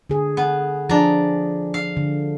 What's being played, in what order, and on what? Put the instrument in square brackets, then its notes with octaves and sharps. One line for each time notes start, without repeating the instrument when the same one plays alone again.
[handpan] D3 G#4
[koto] B3
[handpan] F3 G#4 [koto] D4 A#5
[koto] F5
[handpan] D3